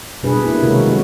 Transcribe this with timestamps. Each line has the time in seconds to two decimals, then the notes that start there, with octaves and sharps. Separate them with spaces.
0.23 B2 G3 B3 D4 G#4 B4
0.45 A#3 E4
0.63 C3 D#3 G#3 C#4 F#4 A#4
0.85 F#3 A3 C4 D#4 F#4